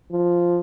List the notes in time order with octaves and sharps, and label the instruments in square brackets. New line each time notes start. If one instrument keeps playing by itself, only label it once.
[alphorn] F3